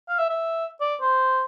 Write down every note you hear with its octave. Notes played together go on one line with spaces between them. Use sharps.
F5
E5
E5
D5
C5